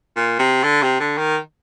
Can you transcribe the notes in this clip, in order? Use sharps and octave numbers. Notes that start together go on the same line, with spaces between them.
A#2
C3
D3
C3
D3
D#3